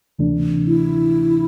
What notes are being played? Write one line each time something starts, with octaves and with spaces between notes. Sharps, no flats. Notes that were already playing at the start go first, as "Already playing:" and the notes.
D2 C3 E3 A3 D4
E4